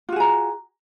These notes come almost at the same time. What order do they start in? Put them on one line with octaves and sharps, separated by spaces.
F4 F#4 G#4 A#5